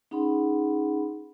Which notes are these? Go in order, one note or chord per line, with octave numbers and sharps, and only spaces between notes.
C#4 D#4 G#4 F#5 B5 C6